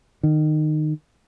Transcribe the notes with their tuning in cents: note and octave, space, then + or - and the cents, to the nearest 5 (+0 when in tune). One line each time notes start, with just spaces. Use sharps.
D#3 -20